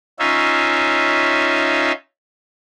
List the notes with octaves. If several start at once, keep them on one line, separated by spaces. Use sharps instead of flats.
C#4 D#4 F4 E5